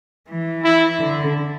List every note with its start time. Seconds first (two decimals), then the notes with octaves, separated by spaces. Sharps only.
0.29 E3
0.64 E4
1.00 D3